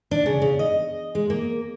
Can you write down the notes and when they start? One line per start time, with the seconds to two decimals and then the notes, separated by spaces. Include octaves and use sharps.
0.11 D4
0.26 C#3
0.42 C#3
0.59 D#5
1.15 G#3
1.30 A#3